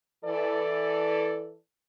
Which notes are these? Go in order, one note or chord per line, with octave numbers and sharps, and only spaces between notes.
E3 A4 D5